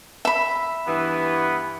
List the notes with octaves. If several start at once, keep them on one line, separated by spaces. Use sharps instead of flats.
E5 B5
G2 E3 B3